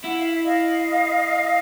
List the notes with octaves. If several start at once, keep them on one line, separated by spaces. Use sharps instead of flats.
E4 F#5
F5
E5
D#5 F5